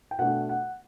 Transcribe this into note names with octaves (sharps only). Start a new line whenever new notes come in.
G5
B2 A3 D4 F#5
F#5